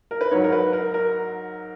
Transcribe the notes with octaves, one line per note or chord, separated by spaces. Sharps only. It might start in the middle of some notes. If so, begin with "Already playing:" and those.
A#4
B4
G#2 F#3 C#5
A#4
B4
A#4
A#4